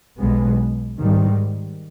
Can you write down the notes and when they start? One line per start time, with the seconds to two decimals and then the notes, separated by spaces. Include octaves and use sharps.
0.19 B1 B2 G#3 B3
0.98 G#2 D#3 G3